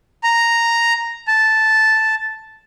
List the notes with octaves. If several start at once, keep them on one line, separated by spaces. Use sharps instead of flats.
A#5
A5